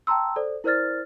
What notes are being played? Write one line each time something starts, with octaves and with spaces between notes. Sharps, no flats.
G5 A5 A#5 C6 E6
A4 C5 D5
E4 A#4 C5 D5 F6 A6